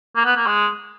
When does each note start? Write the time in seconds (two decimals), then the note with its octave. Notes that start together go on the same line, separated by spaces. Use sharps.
0.16 A#3
0.26 B3
0.37 A#3
0.47 G#3